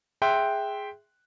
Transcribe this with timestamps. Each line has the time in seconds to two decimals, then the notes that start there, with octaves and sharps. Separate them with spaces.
0.22 G#4 E5 G5 C6 F#6